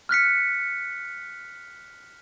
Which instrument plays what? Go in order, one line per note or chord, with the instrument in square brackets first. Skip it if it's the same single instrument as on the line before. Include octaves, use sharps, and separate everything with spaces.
[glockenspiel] F6 F#6 B6 C#7